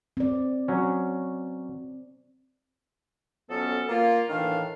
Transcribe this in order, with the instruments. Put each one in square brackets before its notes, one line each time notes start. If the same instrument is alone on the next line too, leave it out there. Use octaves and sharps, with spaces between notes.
[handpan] C4 D5
[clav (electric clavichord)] F#3 C#4
[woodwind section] F2 F#3 B3 C#4 A4
A#3 F4
A2 D#3 E3 D4 F5